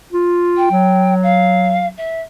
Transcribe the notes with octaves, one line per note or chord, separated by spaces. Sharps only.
F4
G5
F#3
F5
E5